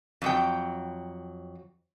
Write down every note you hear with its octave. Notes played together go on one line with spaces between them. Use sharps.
F2 F#3 G5